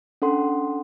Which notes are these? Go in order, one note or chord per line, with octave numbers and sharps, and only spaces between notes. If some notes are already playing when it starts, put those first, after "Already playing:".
C#4 D4 A4 F#5 C6